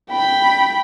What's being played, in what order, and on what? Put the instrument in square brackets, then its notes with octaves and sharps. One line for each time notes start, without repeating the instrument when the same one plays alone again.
[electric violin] G5 B5